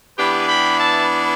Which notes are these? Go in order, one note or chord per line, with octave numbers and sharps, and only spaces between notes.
E3 B3 D4 G4 B4
G5 B5
E5 A5